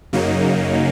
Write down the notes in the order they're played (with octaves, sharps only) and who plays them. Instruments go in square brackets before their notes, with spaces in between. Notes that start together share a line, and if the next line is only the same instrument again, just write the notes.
[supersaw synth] F#2 C#3 F#3 A#3 D#4